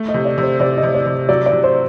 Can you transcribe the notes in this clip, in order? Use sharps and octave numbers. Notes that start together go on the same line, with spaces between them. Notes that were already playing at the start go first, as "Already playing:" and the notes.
Already playing: A3
D#5
C3
D5
C3 C5
C3 D5
D#5
C3
D5
C3
F#3 D5
D5
C3
C5